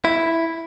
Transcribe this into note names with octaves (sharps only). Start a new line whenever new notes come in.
E4